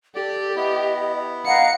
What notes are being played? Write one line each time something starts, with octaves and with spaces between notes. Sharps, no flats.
G4 A4 D5
B3 E4 D#5
D#5 F5 F#5 A#5 C#7